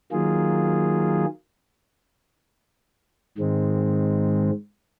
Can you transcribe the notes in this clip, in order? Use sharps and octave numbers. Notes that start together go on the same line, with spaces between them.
D#3 F#3 A#3 F4 G#4
G#2 D#3 G#3 C4